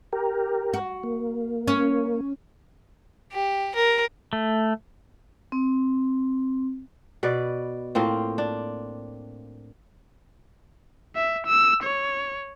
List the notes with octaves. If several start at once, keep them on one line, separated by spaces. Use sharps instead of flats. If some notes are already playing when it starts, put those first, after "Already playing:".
G4 A#4
F#4
A#3
C#4
G4
A#4
A3
C4
B2 B4 D5
A2 A#3 C4 F4
D4
E5
E6
C#5